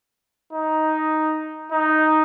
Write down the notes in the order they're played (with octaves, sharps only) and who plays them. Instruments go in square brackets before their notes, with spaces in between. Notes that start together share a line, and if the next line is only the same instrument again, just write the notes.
[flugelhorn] D#4
D#4